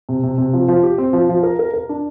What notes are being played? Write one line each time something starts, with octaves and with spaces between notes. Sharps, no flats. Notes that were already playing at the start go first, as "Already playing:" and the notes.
C3
C3
C3
F3
F3
G4
C4
F3
F3
A#4
A#4
A#4
D4